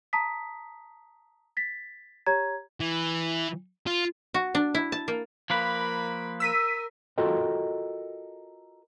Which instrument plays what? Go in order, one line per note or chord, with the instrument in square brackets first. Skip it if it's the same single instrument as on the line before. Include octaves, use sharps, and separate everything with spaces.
[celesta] A5 A#5 D#6 B6
A6 B6
G4 C#5 A#5 G#6
[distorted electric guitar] E3
F4
[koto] F#4
D4
E4
A5
A#3
[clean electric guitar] F3 A#3 B4 [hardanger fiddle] A#4 B5
[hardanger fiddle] A#4 [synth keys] E6 B6 D#7
[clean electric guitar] F4 F#4 A4 A#4 D#5 G5